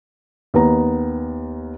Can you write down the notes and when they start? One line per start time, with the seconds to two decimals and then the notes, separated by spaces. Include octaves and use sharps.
0.54 D#2 B3 A#5